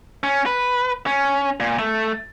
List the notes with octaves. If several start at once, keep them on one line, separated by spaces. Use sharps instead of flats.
C#4
B4
C#4
A#2
A3